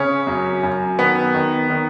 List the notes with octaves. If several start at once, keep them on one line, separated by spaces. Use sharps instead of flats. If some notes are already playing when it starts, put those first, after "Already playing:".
Already playing: C#3 C#4
F#2
F#2
D#3 B3
D#3
D#3